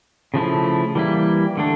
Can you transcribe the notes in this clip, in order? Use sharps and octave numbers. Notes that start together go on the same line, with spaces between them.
C#3 F3 A3 E4
E3 G3 A#3 E4
D3 A3 D4